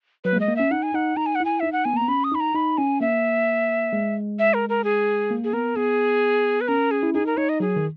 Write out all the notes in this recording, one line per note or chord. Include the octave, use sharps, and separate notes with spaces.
F#3 B4
A#3
G#3 D#5
A#3
C#4 E5
D#4 F#5
G#5
D#4 F#5
D#4 A#5
G#5
F#5
E4 G#5
D#4 E5
F#5
B3 G#5
A#3
B3 A#5
C#4 B5
D#6
D#4 B5
A#5
D#4 B5
C#4 G#5
A#3 E5
G#3
E5
A#4
A#4
G#4
A#3
G#4
B3 A#4
B3 G#4
B4
C#4 A#4
G#4
E4
D#4 G#4
A#4
D#4 C#5
D#5
F#3 G#4
D#3